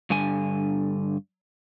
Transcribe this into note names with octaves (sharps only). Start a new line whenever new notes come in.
G2 D3 G#5